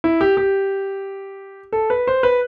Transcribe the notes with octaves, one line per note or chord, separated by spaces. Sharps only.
E4
G4
G4
A4
B4
C5
B4